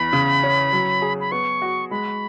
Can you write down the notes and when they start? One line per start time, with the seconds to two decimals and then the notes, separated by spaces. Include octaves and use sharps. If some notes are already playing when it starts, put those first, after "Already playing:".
Already playing: E2 B5
0.13 C#3
0.43 C#4
0.73 F#3
1.02 G#4
1.21 B5
1.32 B3 C#6
1.62 F#4
1.91 G#3 B5